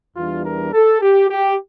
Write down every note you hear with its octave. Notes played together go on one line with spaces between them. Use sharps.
E2 E3 G3 D4 F4
A#4
A4
G4
G4